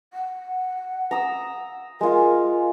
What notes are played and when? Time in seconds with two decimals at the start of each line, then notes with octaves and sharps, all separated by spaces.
0.13 F#5
1.11 A#5 D#6 E6
2.01 G#3 F4 A#4